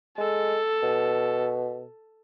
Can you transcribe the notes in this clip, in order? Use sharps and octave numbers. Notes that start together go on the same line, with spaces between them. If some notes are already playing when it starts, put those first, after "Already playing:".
G#3 A4
B2